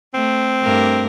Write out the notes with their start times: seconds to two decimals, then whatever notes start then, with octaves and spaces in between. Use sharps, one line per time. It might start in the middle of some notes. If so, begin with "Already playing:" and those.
0.14 A3 C4
0.63 G2 A3 A#4